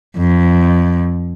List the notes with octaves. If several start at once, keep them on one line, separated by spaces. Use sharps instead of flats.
F2